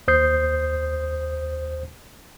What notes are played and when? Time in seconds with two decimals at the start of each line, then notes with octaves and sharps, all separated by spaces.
0.08 D#2 C5 D#6 G6 C7